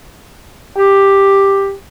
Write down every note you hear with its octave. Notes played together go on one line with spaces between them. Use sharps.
G4